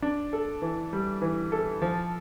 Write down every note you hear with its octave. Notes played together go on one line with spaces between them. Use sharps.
D4
A4
E3
G3
E3
A4
F3